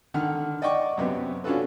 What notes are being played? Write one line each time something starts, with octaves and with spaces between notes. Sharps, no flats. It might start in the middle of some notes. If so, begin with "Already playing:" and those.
D3 D#3 F#5 F6
D5 D#5 F#5 G5 C#6 D6
F#2 C3 B3
C#4 D4 F4 F#4 A4 B4